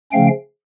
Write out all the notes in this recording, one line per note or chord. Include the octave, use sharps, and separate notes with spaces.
C#3 F3 A3 C#4 F5 G5